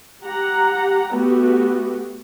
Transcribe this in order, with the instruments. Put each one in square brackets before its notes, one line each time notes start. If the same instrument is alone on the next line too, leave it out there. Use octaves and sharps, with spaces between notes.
[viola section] G4 F#5 A#5
A3 B3 F#4 G4